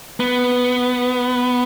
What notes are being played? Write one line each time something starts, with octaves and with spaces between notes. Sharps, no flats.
B3